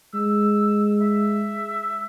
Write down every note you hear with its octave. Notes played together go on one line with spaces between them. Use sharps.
G#3 E6
E5